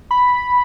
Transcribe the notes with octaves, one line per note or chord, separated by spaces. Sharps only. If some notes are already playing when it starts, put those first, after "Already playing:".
B5